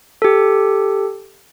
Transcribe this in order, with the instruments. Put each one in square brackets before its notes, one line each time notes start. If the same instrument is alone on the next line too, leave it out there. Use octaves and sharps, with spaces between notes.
[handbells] G4 A4